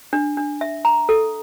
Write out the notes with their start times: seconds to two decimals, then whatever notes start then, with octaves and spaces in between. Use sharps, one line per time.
0.13 D4
0.37 D4
0.61 E5
0.85 A#5
1.09 A4